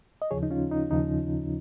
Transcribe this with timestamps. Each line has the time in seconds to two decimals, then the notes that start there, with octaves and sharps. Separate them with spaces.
0.22 D#5
0.31 D#2 C#3 F3 G#4 C#5
0.43 D#4
0.51 C#4 F4
0.71 D#4
0.91 D#2 C#3 F3 D#4